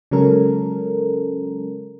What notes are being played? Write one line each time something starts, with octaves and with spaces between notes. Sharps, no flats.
C#3 F#3 G#3 C#4 A4 A#4